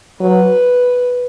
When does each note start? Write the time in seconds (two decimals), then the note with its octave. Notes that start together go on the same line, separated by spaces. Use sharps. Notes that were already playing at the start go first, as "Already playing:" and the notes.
0.20 F#3 B4